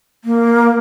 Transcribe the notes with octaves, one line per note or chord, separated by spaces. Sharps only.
A#3